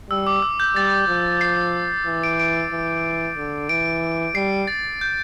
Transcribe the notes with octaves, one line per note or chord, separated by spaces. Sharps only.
G3 E6
D6
E6
G6
G3 A6
F3
C7
E3
D7
D7
E3
D3
E3 D7
G3 C7
A6
G6